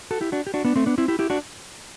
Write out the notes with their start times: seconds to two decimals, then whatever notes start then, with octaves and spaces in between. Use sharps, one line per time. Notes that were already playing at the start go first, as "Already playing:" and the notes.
0.11 F#4 A4
0.21 E4 G4
0.32 D4 F#4
0.47 G4
0.54 D4 F#4
0.65 B3 D4
0.76 A3 C4
0.86 B3 D4
0.98 C4 E4
1.08 E4 G4
1.19 E4 G4
1.30 D4 F#4